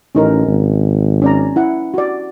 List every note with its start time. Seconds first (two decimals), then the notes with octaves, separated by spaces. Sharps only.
0.15 A1 C#4 D#4 A#4
0.46 G#1
1.22 C#4 D5 A#5
1.56 E4 F#5
1.94 F#4 D5